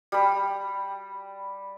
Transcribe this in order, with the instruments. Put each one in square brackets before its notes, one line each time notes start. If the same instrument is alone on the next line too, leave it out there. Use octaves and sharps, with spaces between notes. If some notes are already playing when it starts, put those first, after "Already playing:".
[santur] G3 B5